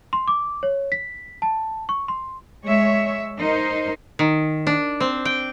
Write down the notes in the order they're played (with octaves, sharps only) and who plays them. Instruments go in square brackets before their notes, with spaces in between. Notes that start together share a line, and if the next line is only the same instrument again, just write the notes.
[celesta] C6
D6
C#5
B6
A5
C#6
C6
[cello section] G#3 C#5 E5
D#4 A#4 C5
[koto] D#3
D4
C4
G5